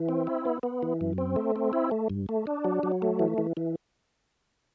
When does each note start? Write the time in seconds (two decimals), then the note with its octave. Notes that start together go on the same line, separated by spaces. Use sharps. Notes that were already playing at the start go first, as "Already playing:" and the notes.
Already playing: E3
0.09 C4
0.27 E4
0.45 B3
0.63 B3
0.83 E3
1.01 F#2
1.18 C4
1.36 A3
1.56 C4
1.73 E4
1.91 A3
2.10 G2
2.29 A3
2.47 D4
2.64 F#3
2.83 F#3
3.02 A3
3.19 E3
3.38 E3
3.57 E3